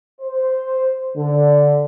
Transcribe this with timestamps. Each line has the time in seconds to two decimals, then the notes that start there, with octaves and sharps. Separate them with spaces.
0.21 C5
1.17 D3